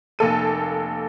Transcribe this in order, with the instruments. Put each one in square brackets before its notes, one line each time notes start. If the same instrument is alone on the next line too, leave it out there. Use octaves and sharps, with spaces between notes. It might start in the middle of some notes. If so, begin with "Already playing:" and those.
[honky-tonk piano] F1 A#3 A4 D#7